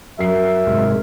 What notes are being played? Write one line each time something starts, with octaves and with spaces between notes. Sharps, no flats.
F#2 A#4 E5 C7
G#2 C3 G#3